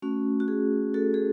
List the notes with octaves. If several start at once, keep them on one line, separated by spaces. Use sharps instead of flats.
A3 C#4 F#4
F#4
G#4
F#4 A4
G#4